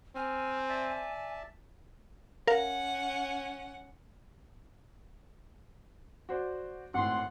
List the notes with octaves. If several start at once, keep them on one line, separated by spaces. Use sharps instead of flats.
C4 G#5 F6
D5 E5 A5
C#4 A#4 F5 F#5
F#4 C5 D5
G#1 A2 F#5 C6